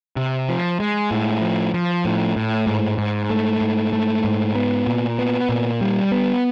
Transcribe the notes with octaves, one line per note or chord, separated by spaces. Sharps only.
C3
F3
G#3
A2
F3
F3
A2
A2
G#2
G#2
A3
G#2
A3
G#2
B3
A#2
B3
A#2
G3
B3